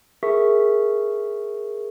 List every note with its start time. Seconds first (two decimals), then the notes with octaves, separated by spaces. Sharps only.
0.23 G#4 A#4 E5 C#6 B6